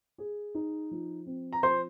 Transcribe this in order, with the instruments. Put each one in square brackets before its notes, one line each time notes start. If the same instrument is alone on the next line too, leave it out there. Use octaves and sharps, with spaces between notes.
[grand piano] G#4
D#4
F3
C4
[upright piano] A#5
[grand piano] F3 [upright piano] C5 C6